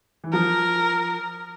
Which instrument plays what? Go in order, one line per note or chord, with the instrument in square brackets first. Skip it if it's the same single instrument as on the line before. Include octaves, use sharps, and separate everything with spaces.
[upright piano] E3
[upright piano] F3 [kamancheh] A#4